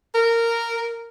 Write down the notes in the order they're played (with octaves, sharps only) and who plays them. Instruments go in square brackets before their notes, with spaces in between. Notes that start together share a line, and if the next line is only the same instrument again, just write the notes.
[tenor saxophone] A#4